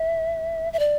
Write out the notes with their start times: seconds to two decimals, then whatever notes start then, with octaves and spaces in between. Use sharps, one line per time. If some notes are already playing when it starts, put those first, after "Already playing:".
Already playing: E5
0.73 E5
0.79 D5